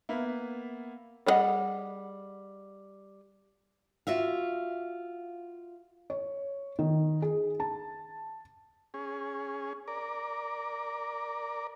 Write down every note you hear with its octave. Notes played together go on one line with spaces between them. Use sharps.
A#3 B3 E5 B5
G3 D4 G#4 D#5 F#5
F4 F#4 E5 F5
C#5
D#3
G#4
A5
C#4 G#4
A#4 D5